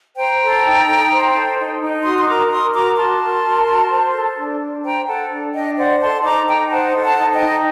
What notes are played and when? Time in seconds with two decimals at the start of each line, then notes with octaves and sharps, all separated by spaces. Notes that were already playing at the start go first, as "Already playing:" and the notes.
0.17 C5 G5 A#5
0.41 A4
0.64 D#4
0.87 D#4
1.11 C5
1.34 A4
1.58 D#4
1.81 D#4
2.04 F#4 C6 D#6
2.18 C6
2.27 A#4 A#5 D6
2.50 A#4 C6 D#6
2.74 F#4 A#5 D6
2.97 F#4 A5 C6
3.22 A#4
3.44 A#4
3.68 F#4
3.91 C5
4.14 A4
4.37 D4
4.61 D4
4.84 C5 G5 A#5
5.08 A4 F#5 A5
5.31 D4
5.54 D4 D#5 G5
5.77 C5 D5 F#5
6.01 A4 A5 C6
6.24 D#4 A#5 D6
6.48 D#4 G5 A#5
6.71 C5 F#5 A5
6.95 A4
7.02 F#5 A5
7.17 D#4
7.33 D#5 G5
7.41 D#4